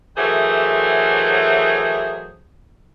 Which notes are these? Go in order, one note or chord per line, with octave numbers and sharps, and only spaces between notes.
D#3 E3 F#3 A3 G#4 C5